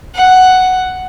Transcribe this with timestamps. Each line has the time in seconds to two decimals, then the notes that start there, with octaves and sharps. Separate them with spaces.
0.15 F#5